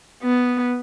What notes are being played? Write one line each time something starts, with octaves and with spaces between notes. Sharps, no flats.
B3